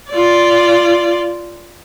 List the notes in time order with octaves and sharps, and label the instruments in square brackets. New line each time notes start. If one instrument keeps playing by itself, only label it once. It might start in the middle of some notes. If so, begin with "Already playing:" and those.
[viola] F4 D5